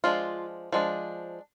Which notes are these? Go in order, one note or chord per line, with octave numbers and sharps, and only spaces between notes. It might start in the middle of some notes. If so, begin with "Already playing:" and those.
F3 G#3 D4 F4
F3 G#3 D4